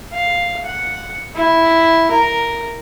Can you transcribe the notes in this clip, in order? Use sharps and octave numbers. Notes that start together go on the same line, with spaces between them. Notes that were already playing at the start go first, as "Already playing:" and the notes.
F5
F#5
E4
A#4